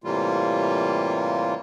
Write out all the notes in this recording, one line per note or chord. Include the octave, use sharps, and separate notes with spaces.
A2 C3 E3 G3 A#3 F4